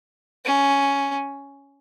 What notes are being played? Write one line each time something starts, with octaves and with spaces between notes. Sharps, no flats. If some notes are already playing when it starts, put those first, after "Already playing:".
C#4